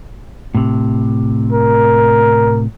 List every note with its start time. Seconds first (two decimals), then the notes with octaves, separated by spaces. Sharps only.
0.55 A2 C3
1.53 A#4